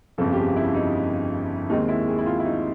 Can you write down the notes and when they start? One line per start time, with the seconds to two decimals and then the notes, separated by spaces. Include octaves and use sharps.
0.18 G1 F2 C#3 F3 A4
0.33 G4
0.37 G#4
0.56 E4
0.74 D#4
1.70 D#2 D#3 G#3 C4 D#4
1.88 E4
2.08 G#4
2.18 E4
2.26 F4
2.39 E4
2.45 D#4